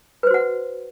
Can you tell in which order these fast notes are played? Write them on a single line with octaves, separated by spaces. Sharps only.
B4 C5 F#4 F#5